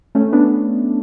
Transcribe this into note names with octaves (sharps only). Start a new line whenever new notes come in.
A3 C#4
B3 D4